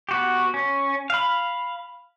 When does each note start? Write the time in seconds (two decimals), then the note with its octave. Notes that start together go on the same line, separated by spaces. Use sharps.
0.09 B3 F#4 G4
0.54 C#4
1.10 F5 B5